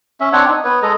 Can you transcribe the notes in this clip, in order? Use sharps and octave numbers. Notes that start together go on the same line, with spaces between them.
C#4 E5
C4 D4 C#5 F#5
D#4
B3 B4 C#5
G#3 A4 D#5 A#5